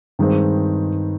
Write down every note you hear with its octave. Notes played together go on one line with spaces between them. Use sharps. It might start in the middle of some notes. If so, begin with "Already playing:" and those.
G2 D#3 G#3 C4